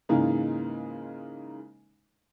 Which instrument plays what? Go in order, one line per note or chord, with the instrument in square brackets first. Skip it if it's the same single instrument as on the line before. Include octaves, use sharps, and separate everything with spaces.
[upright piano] G#2 C#3 E3 G#3 A#3 D#4